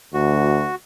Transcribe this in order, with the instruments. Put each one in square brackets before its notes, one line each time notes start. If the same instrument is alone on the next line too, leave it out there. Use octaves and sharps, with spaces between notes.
[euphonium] D2 [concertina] F#4